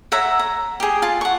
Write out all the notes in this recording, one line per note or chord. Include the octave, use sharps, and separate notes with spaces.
C#5 E5 F#5 A#5
A#5
G4 G#4
F4 A5
F#5 C#6